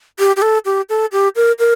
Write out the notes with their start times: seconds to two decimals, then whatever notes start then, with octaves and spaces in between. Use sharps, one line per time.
0.19 G4
0.36 G4
0.42 A4
0.65 G4
0.89 A4
1.12 G4
1.36 A#4
1.59 A#4